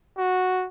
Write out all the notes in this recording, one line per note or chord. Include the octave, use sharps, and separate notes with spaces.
F#4